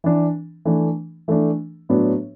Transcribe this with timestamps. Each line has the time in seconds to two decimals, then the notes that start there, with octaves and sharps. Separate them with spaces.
0.04 E3 D4
0.65 E3 A3 D4
1.28 E3 A3 D4
1.89 A2 F#3 B3 D4